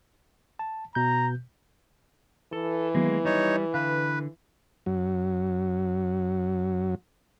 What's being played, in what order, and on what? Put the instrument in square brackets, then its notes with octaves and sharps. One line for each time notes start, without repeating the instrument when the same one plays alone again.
[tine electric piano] A5
[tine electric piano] B2 G6 [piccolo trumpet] A#5
[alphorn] E3 [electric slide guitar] A4
[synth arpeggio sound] D#3 F#3 B3 [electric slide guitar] G#3 A#3
[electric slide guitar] G3 [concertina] D#4 C#5
[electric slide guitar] D3 [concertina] B4 [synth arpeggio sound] F5
[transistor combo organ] F#2 F#3